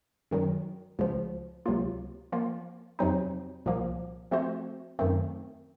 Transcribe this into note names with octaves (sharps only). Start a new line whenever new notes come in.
F#2 D#3 F#3
C#2 C#3 F3
C#2 C3 F#3 A#3 F4
F3 A#3 F4
F2 C3 F#3 C4 D#4
C2 A#2 F3 A#3
F3 A3 C4 F#4 C5
F#2 D#3 A3 C4